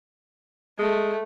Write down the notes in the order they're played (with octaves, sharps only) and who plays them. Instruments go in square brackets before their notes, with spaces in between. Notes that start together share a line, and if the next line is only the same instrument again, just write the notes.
[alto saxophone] G#3 [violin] A3